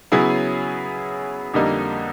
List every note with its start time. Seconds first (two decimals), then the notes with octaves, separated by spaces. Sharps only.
0.12 C#3 F#3 B3 E4 G#4
1.54 F2 D3 G3 A#3 D#4